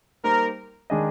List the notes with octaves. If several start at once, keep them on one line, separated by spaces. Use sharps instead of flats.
G3 A#3 D#4 G4 A#4 C5
D#3 G#3 D4 G#4 D#5